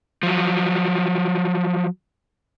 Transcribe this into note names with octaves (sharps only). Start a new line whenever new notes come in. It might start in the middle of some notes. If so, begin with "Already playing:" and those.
F3 F#3